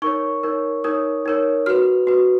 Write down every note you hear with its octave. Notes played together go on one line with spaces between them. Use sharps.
D#4 A#4 C#5 C#6
D#4 A#4 C#5
D#4 A#4 C#5 D#6
D#4 A#4 C#5
F#4 B4 F6
F#4 B4